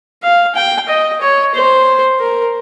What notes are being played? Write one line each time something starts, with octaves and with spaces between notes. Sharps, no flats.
F5
G5
D#5
C#5
C5
A#4